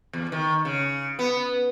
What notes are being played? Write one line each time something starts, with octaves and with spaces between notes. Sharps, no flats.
E2
D#3
C#3
B3